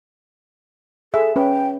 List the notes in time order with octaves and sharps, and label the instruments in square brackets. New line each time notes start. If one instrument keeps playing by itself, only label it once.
[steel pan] G#4 E5 [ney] A4
[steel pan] C#4 B4 [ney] G5